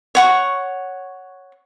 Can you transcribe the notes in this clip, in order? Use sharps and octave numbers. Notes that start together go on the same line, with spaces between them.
C#5 F#5 C#6